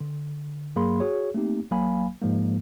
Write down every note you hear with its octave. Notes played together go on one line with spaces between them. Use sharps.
D3
G2 F#3 A#3 G#4 B5 C6
F#4 G#4 C#5
A3 A#3 C4 D#4 G4
A1 F#3 A#3 F5 G#5 B5
G#2 F3 G#3 A#3